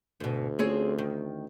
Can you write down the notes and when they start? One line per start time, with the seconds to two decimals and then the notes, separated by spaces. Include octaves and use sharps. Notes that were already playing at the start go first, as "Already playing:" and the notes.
0.20 D2 G#2 B2
0.59 A3 C4 C#4 F4 G#4 C#5
0.98 D#3